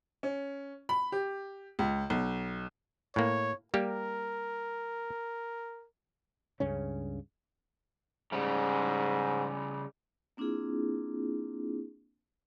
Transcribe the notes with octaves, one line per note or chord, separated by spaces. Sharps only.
C#4
B5
G4
C#2
B1
A2 A#3 C#5
G3 A#3 G4 A#4
C#2 G2 C#3 C#4
G#2 C#3 G3
A#3 C4 D4 E4 F4 G#4